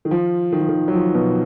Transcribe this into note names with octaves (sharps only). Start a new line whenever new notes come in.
D#3
F3
D#3
F3
D#3
F#3
F3
B2